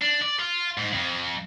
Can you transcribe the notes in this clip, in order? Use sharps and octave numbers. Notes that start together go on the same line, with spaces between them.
D4
D5
F4
G#2
F2